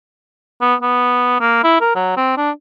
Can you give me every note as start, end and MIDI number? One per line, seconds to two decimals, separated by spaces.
0.61 0.75 59
0.82 1.38 59
1.40 1.62 58
1.64 1.81 64
1.81 1.93 70
1.96 2.13 54
2.17 2.35 60
2.37 2.51 62